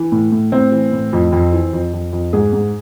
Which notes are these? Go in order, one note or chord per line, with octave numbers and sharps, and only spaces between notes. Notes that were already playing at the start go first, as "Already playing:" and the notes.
Already playing: E3
A2
A2
A2 C4
E3
A2
F2
F2
E3
F2
F2
F2
G#2 G#4
G#2